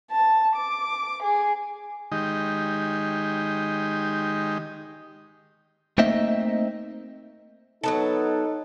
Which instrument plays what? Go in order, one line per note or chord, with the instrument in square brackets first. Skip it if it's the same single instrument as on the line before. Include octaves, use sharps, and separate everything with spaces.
[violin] A5
D6
G#4
[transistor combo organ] D#3 G#3 D#4 G4
[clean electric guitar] A3 A#3 C4 D#4 D#5 E5
[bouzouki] F#3 B3 A5 [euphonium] D#4 [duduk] A4